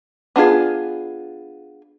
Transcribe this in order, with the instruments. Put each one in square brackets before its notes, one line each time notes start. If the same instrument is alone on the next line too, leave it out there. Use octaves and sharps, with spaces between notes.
[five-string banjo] B3 D4 F4 G#4